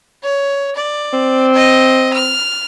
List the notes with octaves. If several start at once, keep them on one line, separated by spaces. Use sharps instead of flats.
C#5
D5
C4
D#5
F6